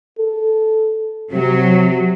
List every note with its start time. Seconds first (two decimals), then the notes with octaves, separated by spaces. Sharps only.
0.18 A4
1.32 C3 F#3